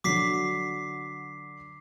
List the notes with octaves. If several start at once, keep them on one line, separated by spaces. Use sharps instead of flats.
D3 F#3 D6 B6 C7